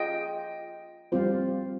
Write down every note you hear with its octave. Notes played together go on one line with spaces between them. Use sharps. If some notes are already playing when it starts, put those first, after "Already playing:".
Already playing: F4 G#4 D#5 G5
G3 C4 F4 C5